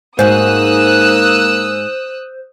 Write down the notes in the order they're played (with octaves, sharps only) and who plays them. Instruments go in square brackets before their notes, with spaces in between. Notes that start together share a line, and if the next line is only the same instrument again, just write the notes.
[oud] G#2 F#4 [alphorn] A#3 [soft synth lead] C5 [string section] D#6 E6 F#6